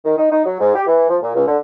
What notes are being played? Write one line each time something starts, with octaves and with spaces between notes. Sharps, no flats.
D#3
D#4
D#4
F#3
G#2
G4
E3
F3
A#2
C#2
D3